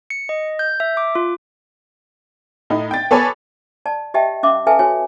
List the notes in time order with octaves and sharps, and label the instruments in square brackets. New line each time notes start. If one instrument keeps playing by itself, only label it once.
[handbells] C#7
D#5
G6
E5
D6
F4
[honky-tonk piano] A2 D#4
G5 A6
B3 A4 C#5 G#5 B5 D6
[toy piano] D5 A5
G4 D#5 E5 G5 A5
C#4 E5 F5 D6
A4 B4 E5 F5 G#5 A5
F#4 C#5 G#5